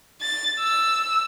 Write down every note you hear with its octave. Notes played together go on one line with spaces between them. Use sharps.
A6
E6